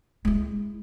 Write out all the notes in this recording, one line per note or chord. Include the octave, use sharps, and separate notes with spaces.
G#3 E4